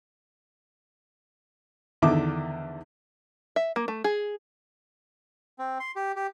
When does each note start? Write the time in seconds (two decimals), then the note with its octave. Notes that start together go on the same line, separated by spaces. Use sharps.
2.02 E2 D3 D#3 E5 D6
3.56 E5
3.76 A#3
3.88 A3
4.04 G#4
5.59 C4
5.80 C6
5.96 G4
6.16 G4